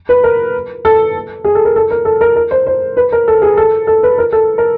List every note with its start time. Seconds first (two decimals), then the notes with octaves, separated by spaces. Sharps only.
0.09 B4
0.24 A#4
0.85 A4
1.44 G#4
1.55 A4
1.65 A#4
1.76 A4
1.91 A#4
2.05 A4
2.21 A#4
2.36 A#4
2.51 C5
2.67 C5
2.97 B4
3.12 A#4
3.28 A4
3.42 G#4
3.57 A4
3.87 A4
4.03 B4
4.18 A#4
4.33 A4
4.58 A#4